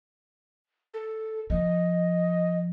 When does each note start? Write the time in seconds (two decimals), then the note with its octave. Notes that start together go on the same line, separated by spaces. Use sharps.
0.94 A4
1.50 F3 D#5